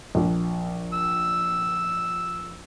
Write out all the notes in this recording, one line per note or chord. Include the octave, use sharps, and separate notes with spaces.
A#1
E6